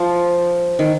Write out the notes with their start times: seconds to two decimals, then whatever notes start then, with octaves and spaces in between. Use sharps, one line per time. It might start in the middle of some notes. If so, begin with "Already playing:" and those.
Already playing: F3
0.79 D#3